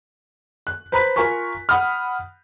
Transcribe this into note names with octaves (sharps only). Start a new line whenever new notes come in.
F#6
B4 C5 A#5 B5 F#6 B6
F4 A#4 G#5 C#6 B6
F#5 B5 D#6 F6